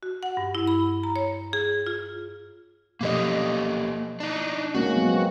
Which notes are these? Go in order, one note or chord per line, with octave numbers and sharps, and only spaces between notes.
F#4
F#5
G2
E4
B5
A#5
C#5
G#4
F4
B2 F3 A#3 G4 A4 D#5
D4 D#4
G#3 A#3 C#4 F#4
F#3 B3 C4